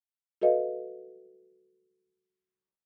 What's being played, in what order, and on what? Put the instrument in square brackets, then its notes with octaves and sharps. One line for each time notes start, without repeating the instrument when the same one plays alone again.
[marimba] F#4 A4 B4 D#5 F5